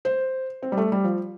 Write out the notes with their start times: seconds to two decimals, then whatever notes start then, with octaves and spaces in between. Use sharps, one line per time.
0.05 C5
0.62 C4
0.72 G3
0.77 A3
0.92 G3
1.04 F3